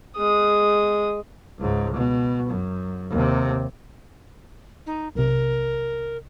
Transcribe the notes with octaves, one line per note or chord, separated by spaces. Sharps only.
G#3 D#6
C#2 G#2
B2
F#2
D#2 C3
D#4
B1 C3 A#4